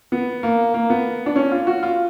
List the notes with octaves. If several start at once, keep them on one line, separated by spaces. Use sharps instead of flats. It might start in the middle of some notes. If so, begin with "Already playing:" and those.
B3
A#3
A#3
B3
D4
C#4
F4
F#4
F4